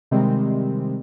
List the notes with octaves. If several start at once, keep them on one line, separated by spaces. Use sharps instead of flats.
C3 D#3 G3 G#3 C4